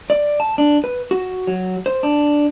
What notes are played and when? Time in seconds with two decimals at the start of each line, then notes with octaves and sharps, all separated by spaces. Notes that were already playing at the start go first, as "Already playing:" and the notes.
0.10 D5
0.40 A5
0.58 D4
0.84 B4
1.11 F#4
1.47 F#3
1.86 C5
2.03 D4